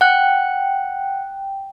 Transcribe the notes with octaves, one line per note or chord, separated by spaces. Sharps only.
F#5 G5 F#6